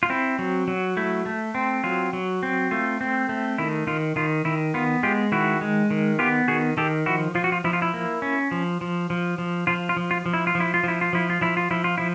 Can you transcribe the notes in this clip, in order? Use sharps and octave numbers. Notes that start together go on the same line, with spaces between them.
F4
C4 E4
F#3
F#3
A3 E4
A3
C4
F#3 F4
F#3
C4
A3 F4
C4
A3
D#3 E4
D#3 F4
D#3 F4
D#3 E4
B3 F4
G#3 F4 G4
D#3 E4 F#4
G#3
D#3
B3 F4 G4
D#3 F#4 G#4
D#3 G4 A4
F3 E4 F#4
F3 F4
F#4
F4
F3 E4
F4
E4
A#3
C#4
F3
F3
F3
F3
F3 F4
F4
F3
F4
F3
E4
F4
F3
E4
F4
F3 E4
F4
F3 E4
F4
F3 E4
F4
F3 E4
F4
F3 E4